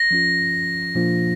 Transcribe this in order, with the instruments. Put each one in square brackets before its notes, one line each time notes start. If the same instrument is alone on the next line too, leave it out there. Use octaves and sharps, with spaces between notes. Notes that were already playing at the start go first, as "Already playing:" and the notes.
Already playing: [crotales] A#6
[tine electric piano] F3 C#4 F4
A#2 F3 A#3 D4 F4